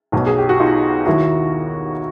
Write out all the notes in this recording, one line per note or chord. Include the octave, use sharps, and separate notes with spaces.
B1 B2 F#3
G#4
G4
F#4
D#4 F4
D#2 D#3 F#3 E4 F#4